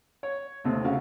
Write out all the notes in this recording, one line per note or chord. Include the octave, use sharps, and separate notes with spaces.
C#5
D#2 C3 A3
C#3 F#4 F5